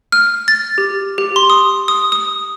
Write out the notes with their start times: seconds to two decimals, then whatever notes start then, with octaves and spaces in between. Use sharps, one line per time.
0.12 F6
0.48 A6
0.78 G4
1.18 G4
1.36 C6
1.50 D#6
1.88 D#6
2.12 D#6